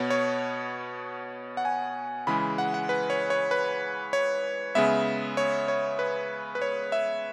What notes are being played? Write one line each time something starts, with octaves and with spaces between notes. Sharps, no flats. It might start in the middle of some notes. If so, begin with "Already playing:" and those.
Already playing: B2 B3 C#5
C#5
F#5
G#5
C#3 E3 G#3 B5
F#5
F#5
B4
C#5
C#5
B4
C#5
C#3 G#3 B3 E5
C#5
C#5
B4
B4
C#5
E5